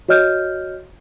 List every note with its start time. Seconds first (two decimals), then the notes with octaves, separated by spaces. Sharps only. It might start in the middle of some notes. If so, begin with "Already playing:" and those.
0.08 F#4 C#5 D#5 F6 G6